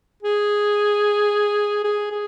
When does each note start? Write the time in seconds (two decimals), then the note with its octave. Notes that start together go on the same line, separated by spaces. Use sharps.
0.23 G#4
1.84 G#4
2.11 G#4